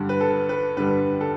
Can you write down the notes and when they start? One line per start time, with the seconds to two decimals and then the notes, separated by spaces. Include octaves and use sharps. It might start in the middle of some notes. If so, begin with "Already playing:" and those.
Already playing: G2 D3 G3
0.09 B4
0.21 A4
0.49 B4
0.77 G2 D3 G3 B4
1.21 A4